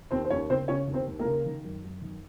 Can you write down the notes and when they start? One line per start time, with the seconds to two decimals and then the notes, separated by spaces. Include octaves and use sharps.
0.11 D#2 C4 C5
0.25 C5
0.30 D#2 C#4 C#5
0.50 C#3 C4 C5
0.68 C#3 C#4 C#5
0.87 D#2
0.93 C4 C5
1.07 D#2
1.19 A#3 A#4
1.25 C#3
1.45 D#3
1.64 F#2
1.83 F#2
2.02 D#3